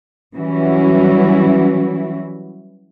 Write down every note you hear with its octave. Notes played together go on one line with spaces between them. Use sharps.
E3 F#3 G3 C#4 E4 F#4